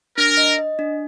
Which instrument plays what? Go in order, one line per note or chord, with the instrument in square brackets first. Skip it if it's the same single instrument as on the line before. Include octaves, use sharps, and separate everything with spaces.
[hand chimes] D4 [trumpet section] A#4
[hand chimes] D#5
D#5
D4